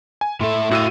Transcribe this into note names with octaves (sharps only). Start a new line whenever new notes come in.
G#5
A2 A4 E5 C6
A2 F#4 F5 E6 D#7